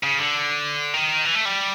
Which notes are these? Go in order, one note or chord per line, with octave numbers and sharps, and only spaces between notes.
C#3
D3
D#3
E3
A3
G3